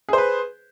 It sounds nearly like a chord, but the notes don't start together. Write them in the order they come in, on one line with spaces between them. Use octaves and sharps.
G#4 C5 B4